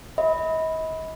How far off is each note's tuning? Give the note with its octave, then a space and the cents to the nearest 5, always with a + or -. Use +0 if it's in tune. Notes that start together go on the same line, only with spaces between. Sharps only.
D#5 +40 B5 +0